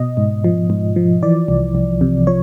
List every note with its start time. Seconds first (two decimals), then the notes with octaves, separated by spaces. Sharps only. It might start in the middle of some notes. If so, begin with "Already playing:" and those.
Already playing: B2 D#5
0.17 G#2
0.44 F3
0.70 G#2
0.96 F3
1.23 E3 D5
1.48 C2
1.75 C2
2.01 C3
2.27 F3 C#5